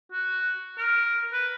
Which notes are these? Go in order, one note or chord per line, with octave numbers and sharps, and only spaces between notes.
F#4
A#4
B4